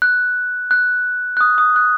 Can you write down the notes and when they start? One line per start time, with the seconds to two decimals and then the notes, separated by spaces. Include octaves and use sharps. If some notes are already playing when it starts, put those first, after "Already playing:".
0.02 F#6
0.71 F#6
1.37 F#6
1.41 D#6
1.58 D#6
1.76 F#6